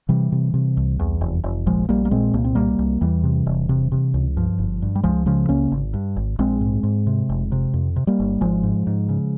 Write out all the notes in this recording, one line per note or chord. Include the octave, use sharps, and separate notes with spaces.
C3 E3 G3
C3
C3
C2
E2
F1
F1
A#1 F3 G#3
A#1 G3 A#3
A#3
A#2 G#3 C4
C2 A#3
C4
C2 G3 A#3
C2
E2 E3 G3
C3
E1
C3
C3
C#2
G2 F3
G1
G2
G3
C#2 F3 G#3
C#3 F3 G#3
C#2 A#3 C#4
G#1
G2
G#1
A#1 G#3 C4
G#2
G#2
C3
F1
C3
F2
C3
G3 A#3
G1
G#1 F3 G#3
G#2
G#2
C#3